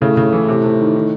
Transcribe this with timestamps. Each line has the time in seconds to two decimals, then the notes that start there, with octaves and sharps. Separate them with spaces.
0.02 A2 C#3
0.17 C#3
0.33 E3
0.48 C3
0.64 C3
0.80 D#3
0.95 D#3